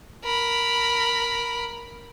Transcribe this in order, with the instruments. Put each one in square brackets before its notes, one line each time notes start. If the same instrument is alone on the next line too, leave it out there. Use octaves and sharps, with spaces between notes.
[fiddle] A#4 B5